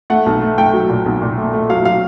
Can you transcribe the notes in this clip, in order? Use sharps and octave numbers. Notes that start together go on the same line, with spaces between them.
A3 F#5
B1
A3
A3 G5
F#3
A#2
B1
A#2
A3
A3
F#3 F5
F#3 F5